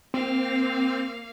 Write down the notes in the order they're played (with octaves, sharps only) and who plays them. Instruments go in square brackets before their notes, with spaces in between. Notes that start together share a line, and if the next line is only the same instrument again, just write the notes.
[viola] A#3 F5 [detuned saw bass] C4